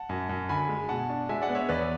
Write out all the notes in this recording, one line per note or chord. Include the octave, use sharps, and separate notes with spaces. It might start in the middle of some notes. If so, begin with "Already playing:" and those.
Already playing: F#5 A5
F#2
F#2
D3 G#5 B5
G#3
B2 F#5 A5
D4
G#3 E5 G#5
D5 F#5
B3
C#5 E5
E2 B4 D5